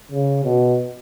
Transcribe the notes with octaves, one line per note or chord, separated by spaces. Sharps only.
C#3
B2